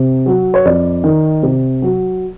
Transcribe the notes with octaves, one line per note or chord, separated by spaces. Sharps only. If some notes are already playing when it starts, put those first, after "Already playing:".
Already playing: C3
F#3
C#5
F2 D5
D#3
C3
F#3